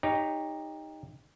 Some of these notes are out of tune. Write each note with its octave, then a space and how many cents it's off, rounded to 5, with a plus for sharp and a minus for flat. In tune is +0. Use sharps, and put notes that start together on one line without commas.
D#4 +0 G4 +25 C#5 +25